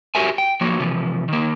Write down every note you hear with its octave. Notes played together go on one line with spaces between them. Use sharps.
F#4 G4 A#4 E5 G#5
G5
F3 F#3 A#3 F#4
C3 E3 F3
D#3 A#3